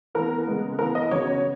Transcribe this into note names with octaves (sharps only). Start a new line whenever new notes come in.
E3 B3 A#4
C#3 G#3 B3
E3 B3 A#4
D#5
C#3 F#3 B3 C#5